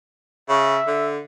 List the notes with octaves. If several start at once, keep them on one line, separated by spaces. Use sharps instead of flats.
C#3 E5
D3